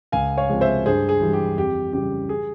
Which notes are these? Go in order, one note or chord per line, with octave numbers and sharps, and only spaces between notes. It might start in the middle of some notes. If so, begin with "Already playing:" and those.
C#2 F5 G#5
C#5 F5
C3 F3 G#3
C5 E5
G2 G#4 C5
G#4
E3 G3
G4
F2 G4
C#3 G3 G4
G#4